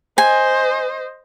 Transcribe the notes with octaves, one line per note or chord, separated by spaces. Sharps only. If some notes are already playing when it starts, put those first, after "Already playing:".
C5 D#5 G#5